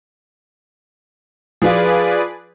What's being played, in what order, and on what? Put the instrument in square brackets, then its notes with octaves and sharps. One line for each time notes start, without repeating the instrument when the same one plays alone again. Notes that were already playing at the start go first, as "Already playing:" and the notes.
[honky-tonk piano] F3 F4 [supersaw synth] G#4 B4 D5